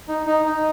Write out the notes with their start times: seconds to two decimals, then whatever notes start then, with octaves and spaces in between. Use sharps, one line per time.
0.08 D#4
0.26 D#4
0.45 D#4